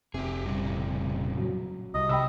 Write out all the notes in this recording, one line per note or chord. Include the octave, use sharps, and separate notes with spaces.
F1 C3 G4 G#4
A#2 C#3 G3
F#3
C2 D#5
C3 G5 B5 E6